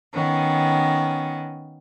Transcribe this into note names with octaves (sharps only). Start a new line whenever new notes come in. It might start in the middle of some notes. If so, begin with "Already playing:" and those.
D#3 B3 C#4